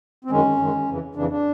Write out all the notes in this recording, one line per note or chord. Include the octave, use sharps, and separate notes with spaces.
C4
F#2 D#3 G#3 C#4
F#2 D#3 G#3
F2 C#3 E3
F2 C#3 E3 D4
D4